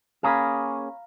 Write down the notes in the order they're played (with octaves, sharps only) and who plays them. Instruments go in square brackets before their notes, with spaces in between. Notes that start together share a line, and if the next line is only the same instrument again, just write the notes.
[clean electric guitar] A#3 C#4 G#4 [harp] F5 A#5 B5